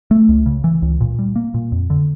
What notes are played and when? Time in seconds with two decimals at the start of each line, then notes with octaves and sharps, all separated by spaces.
0.11 A3
0.29 C#2
0.46 C#3
0.64 E3
0.82 C#2
1.01 A#2
1.19 G3
1.36 A#3
1.54 A#2
1.72 F2
1.90 D3